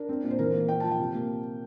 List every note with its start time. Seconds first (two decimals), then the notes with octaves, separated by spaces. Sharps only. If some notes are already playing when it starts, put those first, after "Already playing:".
Already playing: D4 A#4
0.09 C4
0.23 A#2
0.31 C5
0.39 E3 A#4
0.54 A#3
0.69 A#2 G5
0.80 F3 A5
0.91 G5
0.99 C3
1.14 A#3